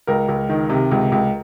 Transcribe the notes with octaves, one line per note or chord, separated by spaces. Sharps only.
C#2 A#4
C#2
D#3
C3
C#2
C#2